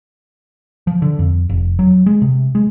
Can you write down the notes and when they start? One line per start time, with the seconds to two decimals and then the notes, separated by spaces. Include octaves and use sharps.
0.87 F3
1.02 D3
1.19 F2
1.49 F1
1.79 F#3
2.06 G#3
2.22 C3
2.55 G#3